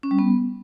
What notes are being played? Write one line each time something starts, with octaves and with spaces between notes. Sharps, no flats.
C#4
G3
B3